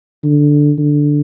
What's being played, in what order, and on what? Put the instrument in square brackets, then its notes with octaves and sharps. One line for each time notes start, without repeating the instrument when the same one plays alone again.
[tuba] D3
D3